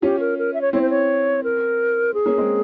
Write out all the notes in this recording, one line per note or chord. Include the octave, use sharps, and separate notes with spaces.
C#4 F4 G4
A#4
A#4
E5
C#5
C4 E4 C#5
C5
C#5
A#4
G#4
A#3 C#4
G#3 C4